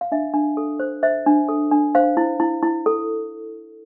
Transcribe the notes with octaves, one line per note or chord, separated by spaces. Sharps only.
F5
D4 E5
D4
A4
C5
C5 E5
D4
A4
D4
C5 F5
E4
E4
E4
A4